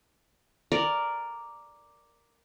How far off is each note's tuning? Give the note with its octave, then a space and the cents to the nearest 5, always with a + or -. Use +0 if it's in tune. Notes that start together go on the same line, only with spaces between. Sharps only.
A#4 +0 D5 +0